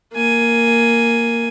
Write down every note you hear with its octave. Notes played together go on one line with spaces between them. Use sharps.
A#3 G#5